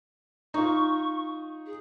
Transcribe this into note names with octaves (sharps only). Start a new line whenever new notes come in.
D#4 F4 C#6
G#4